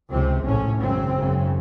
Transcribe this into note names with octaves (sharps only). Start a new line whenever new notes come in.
C#2 C3 C4
A#1 A2 C#4
G#1 F#2 C#3 C4
G#1 F#2 C#3